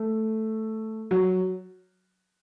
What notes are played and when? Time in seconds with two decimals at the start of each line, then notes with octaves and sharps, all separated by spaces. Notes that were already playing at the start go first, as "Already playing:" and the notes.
Already playing: A3
1.11 F#3